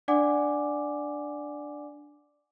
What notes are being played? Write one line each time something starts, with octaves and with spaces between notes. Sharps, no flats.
D4 D5 F#5 G#5 D6